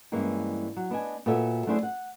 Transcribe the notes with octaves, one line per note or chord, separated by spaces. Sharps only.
G2 E3 G#3 A#3 C#4
F#3
B3 D4 D#5 G#5
A#2 B3 F#4 A4 C#5 E5
F#3 A3 D4 E4 G#4 C5
F#5